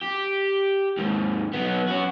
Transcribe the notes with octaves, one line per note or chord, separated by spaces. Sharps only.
G4
D#2 G#2
F#3 B3
C#4 F#4